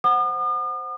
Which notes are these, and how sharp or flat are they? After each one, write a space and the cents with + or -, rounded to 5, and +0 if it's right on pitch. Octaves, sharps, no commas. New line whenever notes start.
C5 +0 F#5 +0 D#6 -45